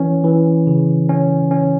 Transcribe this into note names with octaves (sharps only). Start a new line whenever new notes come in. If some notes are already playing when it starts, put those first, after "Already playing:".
Already playing: E3 C#4
E3
C#3
C#4
C#4